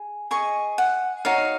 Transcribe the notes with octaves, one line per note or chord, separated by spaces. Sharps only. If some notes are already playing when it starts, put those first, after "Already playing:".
Already playing: G#4
G#4 D#5 C#6
F#5
D#4 F#4 C#5 F5